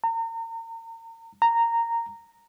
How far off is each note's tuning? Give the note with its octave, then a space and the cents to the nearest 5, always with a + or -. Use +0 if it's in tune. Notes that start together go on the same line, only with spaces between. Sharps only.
A#5 -35
A#5 -10